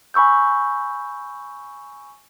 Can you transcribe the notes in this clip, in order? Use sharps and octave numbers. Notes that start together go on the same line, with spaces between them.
G#5 B5 C#6 E6 G6